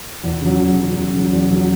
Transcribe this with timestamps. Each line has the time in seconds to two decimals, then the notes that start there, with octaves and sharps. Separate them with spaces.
0.24 E2
0.42 C#3 F#3
0.59 E2
0.77 C#3 F#3
0.95 E2
1.14 C#3 F#3
1.32 E2
1.49 C#3 F#3